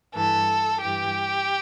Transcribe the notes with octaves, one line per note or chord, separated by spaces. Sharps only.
G2 E3 A4
G2 E3 G4